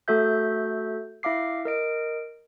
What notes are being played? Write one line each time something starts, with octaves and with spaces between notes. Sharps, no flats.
A3 F#4 A4 E5 G6
E4 E5 F5 D6 C7
A#4 D#5 D7